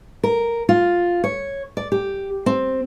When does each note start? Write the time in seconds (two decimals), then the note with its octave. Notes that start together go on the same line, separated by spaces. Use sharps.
0.23 A#4
0.69 F4
1.24 C#5
1.77 D5
1.92 G4
2.46 C4